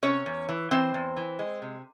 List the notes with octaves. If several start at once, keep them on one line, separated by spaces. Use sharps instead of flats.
C3 C#4 C#5
E2
E3
E3 C4 C5
E2
E3
G#3
C3